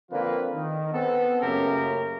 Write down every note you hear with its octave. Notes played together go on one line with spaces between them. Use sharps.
D3 F3 A#3 C4 F4 B4
D#3
B3 C4 A4
F#2 C#3 A3 A#3 G4 A#4